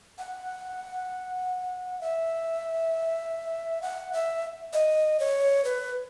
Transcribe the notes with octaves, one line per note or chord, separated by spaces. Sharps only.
F#5
E5
F#5
E5
D#5
C#5
B4